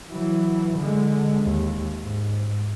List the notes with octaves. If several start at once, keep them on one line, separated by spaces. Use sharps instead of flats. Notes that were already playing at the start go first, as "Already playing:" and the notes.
E3 F#3
D3 G#3
D#2
G#2